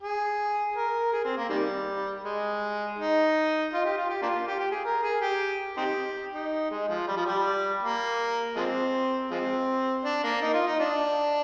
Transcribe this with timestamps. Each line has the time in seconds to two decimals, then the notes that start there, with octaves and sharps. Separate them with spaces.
0.01 G#4
0.76 A#4
1.12 G#4
1.25 C4
1.37 A#3
1.49 C3 D#3 G3
2.24 G#3
2.98 D#4
3.73 F4
3.85 G4
3.98 F4
4.10 G4
4.22 A#3 D4 F4
4.48 G4
4.59 G4
4.71 G#4
4.85 A#4
5.03 G#4
5.22 G4
5.77 C4 D#4 G4
6.34 D#4
6.71 G#3
6.88 F3
7.07 G3
7.16 F3
7.26 G3
7.82 A#3
8.56 F3 G#3 C4
9.31 F3 G#3 C4
10.04 D4
10.24 A#3
10.42 D#4
10.54 F4
10.67 D#4
10.79 D4